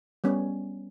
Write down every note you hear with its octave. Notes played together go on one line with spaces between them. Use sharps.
G3 B3 C#4